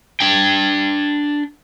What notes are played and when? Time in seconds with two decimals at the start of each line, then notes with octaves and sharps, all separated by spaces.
0.20 D4 G5